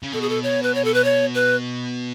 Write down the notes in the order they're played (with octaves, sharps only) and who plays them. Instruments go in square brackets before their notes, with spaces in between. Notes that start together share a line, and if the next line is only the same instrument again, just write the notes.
[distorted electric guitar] C#3
[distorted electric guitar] B2 [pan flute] A4
[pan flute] G#4
A4
C#5
B4
C#5
A4
B4
C#5
B4